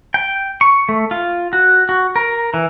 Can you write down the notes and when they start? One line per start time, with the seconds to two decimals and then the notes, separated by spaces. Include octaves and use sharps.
0.14 G5
0.61 C#6
0.89 A3
1.11 F4
1.53 F#4
1.89 F#4
2.16 A#4
2.54 E3